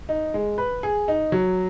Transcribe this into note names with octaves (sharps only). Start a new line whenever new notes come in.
D#4
G#3
B4
G#4
D#4
F#3